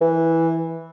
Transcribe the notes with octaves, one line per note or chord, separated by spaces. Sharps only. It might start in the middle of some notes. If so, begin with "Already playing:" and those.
E3